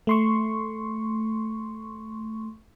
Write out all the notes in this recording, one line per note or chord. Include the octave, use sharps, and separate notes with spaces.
A3 C6 C#6